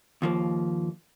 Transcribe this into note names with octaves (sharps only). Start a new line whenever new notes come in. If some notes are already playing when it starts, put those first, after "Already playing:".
D#2 F3 A#3